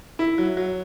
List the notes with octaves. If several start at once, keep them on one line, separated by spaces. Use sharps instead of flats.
E4
F#3
F#3